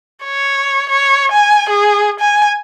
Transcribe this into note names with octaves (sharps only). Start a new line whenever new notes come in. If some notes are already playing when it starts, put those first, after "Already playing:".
C#5
C#5
G#5
G#4
G#5